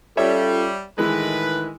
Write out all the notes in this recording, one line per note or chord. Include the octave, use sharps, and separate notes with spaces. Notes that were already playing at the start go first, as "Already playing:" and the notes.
G3 C#4 F4 A4 C#5 E5
A2 D#3 E3 G#3 G#4 B4